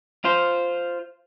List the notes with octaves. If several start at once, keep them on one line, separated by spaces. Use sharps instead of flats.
F4 C5